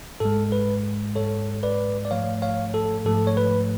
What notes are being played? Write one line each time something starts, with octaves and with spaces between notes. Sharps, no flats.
G#2 G#3 A4
B4
G#2 G#3 A4 C#5
B4 D5
D5
G#2 F3 A3 C#5 F5
C#5 F5
A4
G#2 F3 A3 A4
C#5
B4